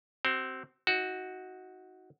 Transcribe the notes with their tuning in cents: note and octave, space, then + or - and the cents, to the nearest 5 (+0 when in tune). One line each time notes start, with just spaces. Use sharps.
C4 +0 F#4 +40
D#4 +35 F#4 +0